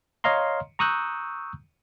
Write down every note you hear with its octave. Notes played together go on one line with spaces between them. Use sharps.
C#5 D#5 F5 A#5 C6
A#5 C#6 D#6 E6 F#6 G6